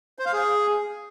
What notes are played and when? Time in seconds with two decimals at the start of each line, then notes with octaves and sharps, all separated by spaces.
0.19 C5
0.26 F5
0.33 G#4